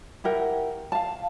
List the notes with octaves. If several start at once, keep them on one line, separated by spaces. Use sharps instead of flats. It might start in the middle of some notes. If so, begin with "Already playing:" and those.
E4 G4 A#4 F#5
F5 A5